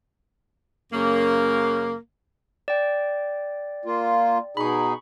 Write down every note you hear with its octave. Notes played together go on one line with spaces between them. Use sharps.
F#2 C#3 A#3
D5 G5
A#3 F4
B2 D#4 G#4 B5 C#6